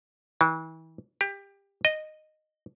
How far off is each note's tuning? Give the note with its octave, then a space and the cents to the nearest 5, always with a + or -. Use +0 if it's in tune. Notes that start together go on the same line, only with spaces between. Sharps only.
E3 -35
G4 +20
D#5 -10